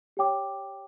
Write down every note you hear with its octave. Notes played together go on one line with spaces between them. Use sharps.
G4 C#5 G5 D6